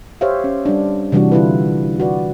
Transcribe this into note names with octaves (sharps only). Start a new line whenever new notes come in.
G4 C5 C#5 E5 F5
C#4
G3 D4
C3 E3 G3 D4 F#4
D3 E4 F4 B4
F#4 B4 D5